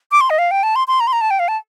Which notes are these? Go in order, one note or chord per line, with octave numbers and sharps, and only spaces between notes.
D6
C6
D#5
F5
G5
A5
C6
C6
A#5
C6
A#5
A5
G5
F5
A5